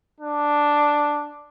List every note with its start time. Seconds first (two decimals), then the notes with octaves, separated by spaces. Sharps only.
0.20 D4